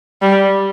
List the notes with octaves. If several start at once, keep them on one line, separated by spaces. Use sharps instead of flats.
G3